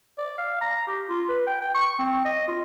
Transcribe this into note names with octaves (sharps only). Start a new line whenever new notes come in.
D5
F5
A#5
G4
F4
B4
G5
G5
C#6
C4
D#5
F4